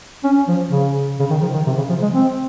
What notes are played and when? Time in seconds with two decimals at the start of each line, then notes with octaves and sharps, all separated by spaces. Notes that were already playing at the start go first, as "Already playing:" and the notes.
0.24 C#4
0.48 F3
0.71 C#3
1.19 C#3
1.30 D#3
1.42 F3
1.54 D#3
1.67 C3
1.78 C#3
1.89 F3
2.02 G#3
2.13 C4